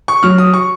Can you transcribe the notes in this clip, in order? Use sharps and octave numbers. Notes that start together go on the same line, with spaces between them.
C#6
F#3 F6
D#6
C#6